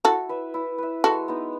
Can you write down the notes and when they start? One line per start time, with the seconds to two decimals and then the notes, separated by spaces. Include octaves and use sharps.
0.05 E4 F#4 A4
0.29 B4 E5
0.54 E4
0.78 B4 E5
1.04 G#3 F#4 A4
1.28 B3 D#4